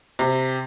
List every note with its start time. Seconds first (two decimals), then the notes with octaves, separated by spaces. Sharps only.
0.19 C3